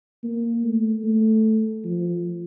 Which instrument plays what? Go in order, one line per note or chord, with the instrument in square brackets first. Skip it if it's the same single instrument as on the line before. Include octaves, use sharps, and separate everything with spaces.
[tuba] A#3
A3
A3
F3